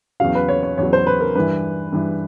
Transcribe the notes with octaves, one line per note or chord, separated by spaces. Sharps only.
E2 C#3 F#3 F5
B4
C#5
C#5
E2 C#3 F#3 C#5
C5
B4
A#4
G2 E3 B4
G2 E3